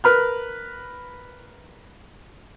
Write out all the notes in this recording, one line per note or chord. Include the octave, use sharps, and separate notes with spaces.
A#4 B4 B5 F6